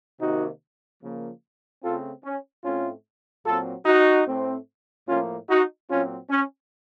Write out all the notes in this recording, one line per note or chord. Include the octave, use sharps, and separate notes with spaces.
C3 D#3 A#3 D#4 F#4
C#3 F3 A#3
C#3 A3 C4 F4 A4
C#4
A2 A3 C4 C#4 F4
A#2 F#3 C4 F4 A4
D#4 F#4
A2 A3 C4
A2 F3 A#3 C#4 F4
D#4 F#4
A#2 F#3 C4 C#4 F4
C#4